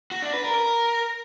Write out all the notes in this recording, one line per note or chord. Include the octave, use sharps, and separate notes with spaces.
F#4
D4
B4
A#4
A#4